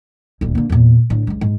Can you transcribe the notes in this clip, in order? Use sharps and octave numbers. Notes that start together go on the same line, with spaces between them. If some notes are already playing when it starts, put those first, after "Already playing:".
D#1 D2
D3 A#3
E2 A#2
A2 D3
C#2 G3
G#2